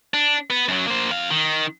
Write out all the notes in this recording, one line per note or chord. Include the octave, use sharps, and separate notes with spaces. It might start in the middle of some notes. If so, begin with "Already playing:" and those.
D4
B3
F#2 F#3
A#3 C5
F2 F5
D#3